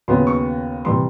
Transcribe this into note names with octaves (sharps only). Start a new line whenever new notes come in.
D#2 C#3 F#3 B3 C6
C#6
C3 E3 G3 C6